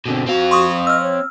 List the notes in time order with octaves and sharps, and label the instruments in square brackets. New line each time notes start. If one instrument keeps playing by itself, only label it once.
[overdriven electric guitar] B2 D3 [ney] C4
[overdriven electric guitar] C4 F5 [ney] F#4
[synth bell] C6 C#6 D#6
[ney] D#5 [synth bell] E6 F6
[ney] C#5